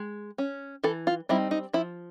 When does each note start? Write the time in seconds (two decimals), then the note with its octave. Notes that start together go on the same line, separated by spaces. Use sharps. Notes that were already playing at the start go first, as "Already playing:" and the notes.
Already playing: G#3
0.38 C#4
0.84 E3 A4
1.07 F4
1.29 G3 C4 D#4 E4
1.51 D#4
1.73 F3 E4